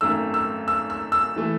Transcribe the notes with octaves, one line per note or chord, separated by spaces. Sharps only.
G#1 F#2 D#3 A3 E6
E6
E6
E6
E6
E3 A3